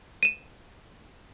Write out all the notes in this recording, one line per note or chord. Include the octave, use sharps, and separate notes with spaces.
D#7 E7